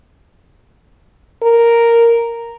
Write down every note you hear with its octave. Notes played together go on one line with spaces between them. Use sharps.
A#4